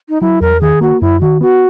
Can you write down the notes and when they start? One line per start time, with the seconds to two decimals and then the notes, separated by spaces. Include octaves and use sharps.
0.09 D#4
0.21 F#3 E4
0.41 E2 A#4
0.61 D#3 G#4
0.81 A#3 F#4
1.01 F#2 E4
1.21 D#3 F#4
1.41 B3 F#4